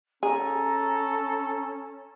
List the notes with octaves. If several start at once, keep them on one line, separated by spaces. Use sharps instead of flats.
C#4 G#4 A4 A#5